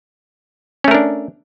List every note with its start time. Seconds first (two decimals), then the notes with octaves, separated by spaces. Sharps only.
0.84 C#4
0.88 A3
0.91 A#4
0.95 D4